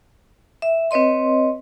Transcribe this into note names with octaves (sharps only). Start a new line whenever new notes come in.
E5
C4 B4 C#5 D#5 C6